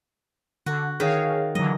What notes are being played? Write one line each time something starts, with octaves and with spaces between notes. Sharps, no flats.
D3 F#4
D#3 G#4 C#5 F5
D3 E3 F#3 D#5